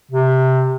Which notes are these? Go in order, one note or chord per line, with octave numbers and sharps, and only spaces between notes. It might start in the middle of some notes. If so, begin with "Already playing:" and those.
C3